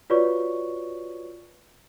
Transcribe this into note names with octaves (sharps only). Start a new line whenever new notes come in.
F4 F#4 B4 C#5 D5 C#6